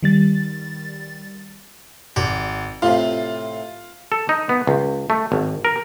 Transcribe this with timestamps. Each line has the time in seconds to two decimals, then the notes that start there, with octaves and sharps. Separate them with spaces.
0.03 D#3 G3 A6
2.16 G#1 D5
2.82 A2 C3 F4
4.12 A4
4.29 D#4
4.49 B3
4.67 C#2
5.10 A3
5.32 G#1
5.65 A#4